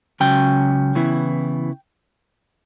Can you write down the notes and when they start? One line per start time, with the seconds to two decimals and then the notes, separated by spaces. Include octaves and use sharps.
0.20 C#2 C#3 F#3 C#4 G5
0.95 C#3 E3 B3 E4